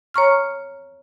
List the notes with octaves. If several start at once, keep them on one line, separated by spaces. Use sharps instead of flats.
C#5 A#5 C#6 F6